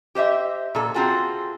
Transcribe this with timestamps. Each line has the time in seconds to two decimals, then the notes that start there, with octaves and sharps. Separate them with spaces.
0.15 G4 C5 D#5 E5
0.75 A#2 A4
0.94 C4 F4 F#4 G#4 A4